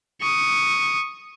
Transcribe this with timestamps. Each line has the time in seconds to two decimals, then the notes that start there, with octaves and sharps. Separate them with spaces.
0.21 C#6 D#6